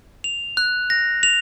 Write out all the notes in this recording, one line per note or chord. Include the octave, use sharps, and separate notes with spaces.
F7
F#6
A#6
F7